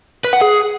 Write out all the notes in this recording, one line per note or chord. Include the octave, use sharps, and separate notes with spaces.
B4
F#5
G#4